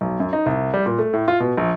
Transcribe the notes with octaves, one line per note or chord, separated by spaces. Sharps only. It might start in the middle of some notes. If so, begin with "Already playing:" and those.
B1
F#2
D#4
C2
G3
A#2
A3
A2
F4
B2
A#1